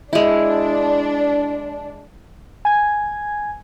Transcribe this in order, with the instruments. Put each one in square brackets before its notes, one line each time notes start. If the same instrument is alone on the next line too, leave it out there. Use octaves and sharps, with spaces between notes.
[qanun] G#3 E4 [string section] D4
[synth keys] G#5 G#6